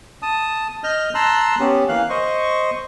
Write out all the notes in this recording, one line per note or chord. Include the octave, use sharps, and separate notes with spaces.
A5 D#6
D#5 F6 G6
A5 A#5 C6 E6 F#6
B3 C#4 G4
E3 A#3 F5 F#6
C5 D#5 C#6